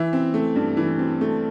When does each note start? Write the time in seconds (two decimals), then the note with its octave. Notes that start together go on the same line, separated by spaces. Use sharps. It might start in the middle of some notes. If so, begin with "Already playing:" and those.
Already playing: E3 E5
0.13 C4
0.34 A3
0.56 G2
0.77 E3
0.99 C4
1.21 A3